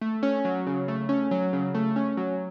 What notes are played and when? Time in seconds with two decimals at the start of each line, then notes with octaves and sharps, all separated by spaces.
0.01 A3
0.23 C#4
0.45 F#3
0.67 C#3
0.88 A3
1.09 C#4
1.31 F#3
1.53 C#3
1.75 A3
1.96 C#4
2.17 F#3